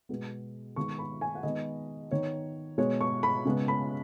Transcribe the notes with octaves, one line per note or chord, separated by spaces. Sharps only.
B2 G#3 B3
D#3 G#3 B3 C#6
B5
G#5
F#5
D#3 G#3 B3 D#5
D#3 B3 C#5
B2 G#3 B3 C#5
C#6
B5
C#3 G#3 B3
B5